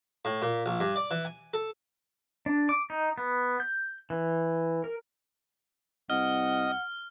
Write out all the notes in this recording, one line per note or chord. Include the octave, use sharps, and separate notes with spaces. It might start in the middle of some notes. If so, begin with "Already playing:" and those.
A2
A#2
A#1
G2
D5
E3
G#5
A4
D4
D6
D#4
B3
G6
E3
A#4
C2 D#5 F#5 F6